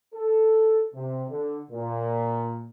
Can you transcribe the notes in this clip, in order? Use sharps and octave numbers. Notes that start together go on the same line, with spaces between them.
A4
C3
D3
A#2